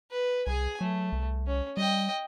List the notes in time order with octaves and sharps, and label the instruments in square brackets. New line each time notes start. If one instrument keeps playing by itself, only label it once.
[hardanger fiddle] B4
[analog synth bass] C2 [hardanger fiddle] G#4 G#5
[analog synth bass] F#3 [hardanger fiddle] A3
[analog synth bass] C2
[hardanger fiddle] C#4
[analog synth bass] G3 [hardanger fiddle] D#5 G5